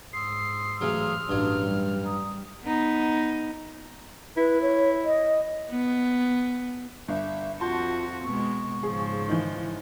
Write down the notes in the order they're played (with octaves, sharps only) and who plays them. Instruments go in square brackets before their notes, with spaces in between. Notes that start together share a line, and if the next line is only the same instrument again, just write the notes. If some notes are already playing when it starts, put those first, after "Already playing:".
[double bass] G#2 [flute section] C6 D#6 E6 [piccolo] C7
[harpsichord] A1 C#3 F#3 [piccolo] F6
[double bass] A1 D4 [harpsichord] G2 F#3
[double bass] G3
[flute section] A#5 D#6
[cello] B3 D#4
[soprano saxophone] E4 [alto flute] B4
[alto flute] C#5
D#5
[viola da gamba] B3
[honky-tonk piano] G1 [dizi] E5
[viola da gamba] F2 F#4 [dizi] F4 [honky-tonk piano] A5 C6 G6
[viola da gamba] B2 G#3 [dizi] C#6
[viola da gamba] G#2 C#3 F3 [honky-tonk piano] G#4
[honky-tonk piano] D#3 E3